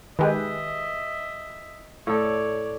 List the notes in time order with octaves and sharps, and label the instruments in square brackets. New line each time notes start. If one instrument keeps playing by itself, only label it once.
[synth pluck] D#3 G#3 [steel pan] G4 G#4 B4 [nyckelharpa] D#5 E5
[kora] A2 A4 [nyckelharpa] C#5 D5